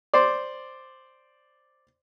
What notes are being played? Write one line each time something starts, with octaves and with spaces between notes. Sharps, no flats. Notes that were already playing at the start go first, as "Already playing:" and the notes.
C5 D5